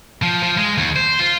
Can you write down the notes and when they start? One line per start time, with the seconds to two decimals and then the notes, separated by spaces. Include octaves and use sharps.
0.23 F3
0.43 F3
0.58 G#3
0.78 D#2
0.96 C5
1.19 F4